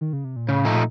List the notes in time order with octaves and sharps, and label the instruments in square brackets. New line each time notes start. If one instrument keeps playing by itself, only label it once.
[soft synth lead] D#3
C#3
C3
A#2
[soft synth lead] A2 [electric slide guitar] C#3
[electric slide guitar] F3 A3 D#4
[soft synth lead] A#2